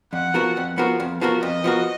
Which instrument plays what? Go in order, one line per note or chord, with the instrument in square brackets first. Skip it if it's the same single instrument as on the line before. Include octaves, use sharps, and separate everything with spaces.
[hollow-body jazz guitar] F2 [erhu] F#5
[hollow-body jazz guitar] F3 B3 F#4 A#4
F2
F3 B3 F#4 A#4
F2
F3 B3 F#4 A#4
[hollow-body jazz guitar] F2 [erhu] D#5
[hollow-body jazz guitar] F3 B3 F#4 A#4